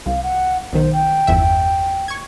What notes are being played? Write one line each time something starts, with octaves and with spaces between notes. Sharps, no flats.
C2 F5
F#5
B1 D#3 C5
G5
G1 E2 E5
C#6 G#6